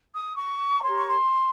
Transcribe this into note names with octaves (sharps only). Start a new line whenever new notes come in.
D#6
C#6
A#5
G4 A#4 C#5 C6
C#6
C6